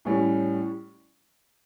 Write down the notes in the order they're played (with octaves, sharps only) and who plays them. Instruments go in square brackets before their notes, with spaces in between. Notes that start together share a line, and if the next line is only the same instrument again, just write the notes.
[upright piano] A2 G3 C#4